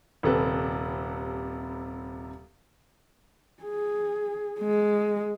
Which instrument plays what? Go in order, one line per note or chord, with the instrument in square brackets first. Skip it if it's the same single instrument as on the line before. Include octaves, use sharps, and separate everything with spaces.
[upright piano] D#1 C3 A4 B4
[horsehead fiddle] G#4
G#3